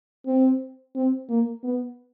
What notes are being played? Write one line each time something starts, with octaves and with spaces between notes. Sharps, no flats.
C4
C4
A#3
B3